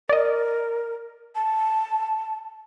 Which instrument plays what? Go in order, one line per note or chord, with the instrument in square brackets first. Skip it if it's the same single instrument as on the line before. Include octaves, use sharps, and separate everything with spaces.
[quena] A#4 [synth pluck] D5 D#5
[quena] A5